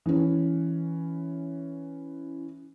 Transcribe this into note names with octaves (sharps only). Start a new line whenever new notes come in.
E3 C#4